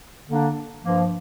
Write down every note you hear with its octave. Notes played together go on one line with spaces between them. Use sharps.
D3 A#3 D4
G2 F3 A#3